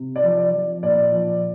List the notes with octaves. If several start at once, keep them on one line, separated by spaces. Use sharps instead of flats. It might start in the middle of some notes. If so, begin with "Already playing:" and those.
Already playing: C3
D5
F3
D5
F3
A#2 D5
F3